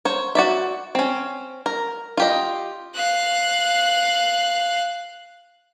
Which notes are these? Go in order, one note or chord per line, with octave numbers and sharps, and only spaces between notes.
C5 C#5
F#4 D5 E5
C4 C#4
A#4
F4 G4 D#5
F5 F#6